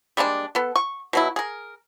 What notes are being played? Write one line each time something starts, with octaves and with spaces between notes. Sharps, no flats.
G3 G#3 A#3 D4
B3 A4
C#6
B2 F#3 E4
G#4 A#4